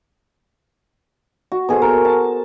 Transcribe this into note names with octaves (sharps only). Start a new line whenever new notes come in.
F#4
B2 G#4 A4 C5
A#4
A5